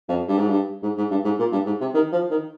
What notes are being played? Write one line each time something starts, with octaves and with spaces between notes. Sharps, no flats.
F2
G2
G#2
G2
G#2
G#2
G2
G#2
A#2
G2
G#2
C3
D#3
F3
D#3